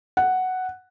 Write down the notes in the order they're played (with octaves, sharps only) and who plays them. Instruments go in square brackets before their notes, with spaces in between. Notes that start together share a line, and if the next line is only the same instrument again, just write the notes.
[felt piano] F#5